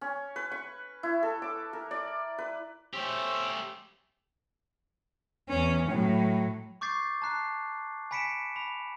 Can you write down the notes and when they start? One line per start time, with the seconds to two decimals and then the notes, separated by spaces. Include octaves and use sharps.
0.01 C#4
0.36 B4
0.52 C#6
1.03 E4
1.23 A4
1.42 D6
1.73 A#4
1.91 D5
2.38 B4
2.93 A3 C#4 G4 C5 E6
5.49 E2 C#4
5.89 A2 F#3
6.81 C#6 D6 G6 A6 C7
7.22 A5 A#5 F#6 C7
8.11 G#5 B5 B6 C#7 D7 E7
8.56 B5